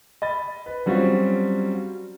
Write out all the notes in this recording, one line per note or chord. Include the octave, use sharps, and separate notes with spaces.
D#5 B5 A6
B4
F#3 G3 C4 C#4 F4 F#4